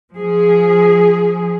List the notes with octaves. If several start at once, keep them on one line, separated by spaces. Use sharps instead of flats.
F3 G#4